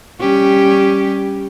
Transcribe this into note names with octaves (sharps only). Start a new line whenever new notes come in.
G3 C#4 G4